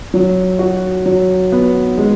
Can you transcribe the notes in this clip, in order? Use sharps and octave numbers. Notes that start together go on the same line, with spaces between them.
F#3
F#4
F#3
B3
G#3